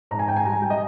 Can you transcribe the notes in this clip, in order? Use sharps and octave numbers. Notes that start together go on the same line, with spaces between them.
G#2 A#5
G#5
G#2 G5
G#5
G3 A#5
G#5
G3 G5
D#5